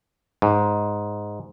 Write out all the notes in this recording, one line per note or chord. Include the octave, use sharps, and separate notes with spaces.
G#2